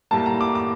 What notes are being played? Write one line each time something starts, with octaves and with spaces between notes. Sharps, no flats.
A2 G3 A#3 A5
A#5
D6
D6